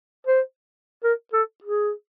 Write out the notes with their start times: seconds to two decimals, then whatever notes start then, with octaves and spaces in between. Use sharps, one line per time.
0.27 C5
1.04 A#4
1.33 A4
1.64 G#4